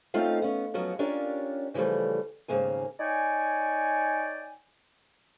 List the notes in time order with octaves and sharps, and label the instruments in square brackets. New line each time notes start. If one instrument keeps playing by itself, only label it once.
[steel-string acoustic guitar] A3 C4 C#4 D#4 F4 F5
B3 C#4
F3 F#3 B3 C#4
C#4 D4 F4 G4 A#4 C#5
C#3 E3 F3 G3 A3
D#2 G#2 C#3 A#3 G#5
[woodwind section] D#4 C#5 D5 G5 G#5